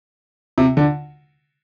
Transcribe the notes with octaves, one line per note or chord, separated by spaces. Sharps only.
C3
D3